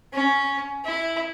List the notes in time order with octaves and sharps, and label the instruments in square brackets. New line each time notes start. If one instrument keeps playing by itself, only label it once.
[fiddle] C#4
E4